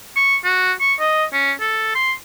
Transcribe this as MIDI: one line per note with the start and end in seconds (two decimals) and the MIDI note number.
0.16 0.37 85
0.44 0.72 66
0.81 0.94 85
1.00 1.25 75
1.33 1.52 61
1.60 1.90 69
1.95 2.12 84